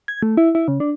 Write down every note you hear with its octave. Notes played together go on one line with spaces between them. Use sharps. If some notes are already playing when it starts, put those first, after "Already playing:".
G#6
A3
E4
E4
C#3
D4